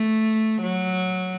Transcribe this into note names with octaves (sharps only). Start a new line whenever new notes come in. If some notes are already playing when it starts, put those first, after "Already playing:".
Already playing: A3
F#3